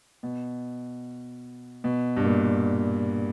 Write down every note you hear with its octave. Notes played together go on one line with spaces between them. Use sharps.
B2
B2
G2
A#2